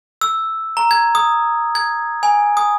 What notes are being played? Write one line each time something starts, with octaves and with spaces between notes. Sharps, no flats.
E6
A#5
G#6
D#6
G#6
G#5
D#6